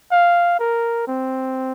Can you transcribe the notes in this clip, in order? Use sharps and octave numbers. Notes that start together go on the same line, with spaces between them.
F5
A#4
C4